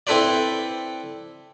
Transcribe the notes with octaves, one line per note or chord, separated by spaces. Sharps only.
C4 E4 A4 B4 C5 D5